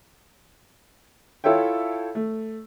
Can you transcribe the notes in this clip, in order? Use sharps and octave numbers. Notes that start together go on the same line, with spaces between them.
E4 F4 A4 C#5 E5 G5
A3